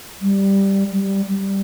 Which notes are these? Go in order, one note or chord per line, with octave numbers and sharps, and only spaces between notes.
G3
G3
G3